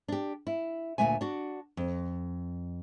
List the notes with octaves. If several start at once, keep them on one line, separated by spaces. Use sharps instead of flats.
D4 G4
E4
D2 A#2 E3 B3 E5 G#5
D4 F#4
F2